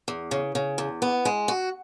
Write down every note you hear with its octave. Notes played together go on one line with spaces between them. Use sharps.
E2
C#3
C#3
E2
B3
G#3
F#4